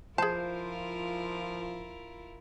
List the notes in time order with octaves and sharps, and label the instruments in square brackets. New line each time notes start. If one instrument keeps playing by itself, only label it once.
[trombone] F3 [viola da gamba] E4 F4 A#4 [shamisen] G#4 A5 [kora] C5